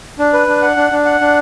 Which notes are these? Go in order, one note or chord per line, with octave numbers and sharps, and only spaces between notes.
D4
B4
D4
F#5
D4
D4
F#5
D4